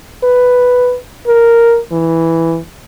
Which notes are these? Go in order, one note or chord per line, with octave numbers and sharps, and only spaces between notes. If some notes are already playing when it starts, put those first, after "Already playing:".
B4
A#4
E3